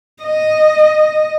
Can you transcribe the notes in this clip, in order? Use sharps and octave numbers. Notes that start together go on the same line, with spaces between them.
D#5